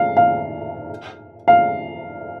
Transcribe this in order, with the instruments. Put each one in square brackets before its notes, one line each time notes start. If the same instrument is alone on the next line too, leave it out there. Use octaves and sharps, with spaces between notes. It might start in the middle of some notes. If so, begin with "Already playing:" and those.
Already playing: [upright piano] F5
F5
F5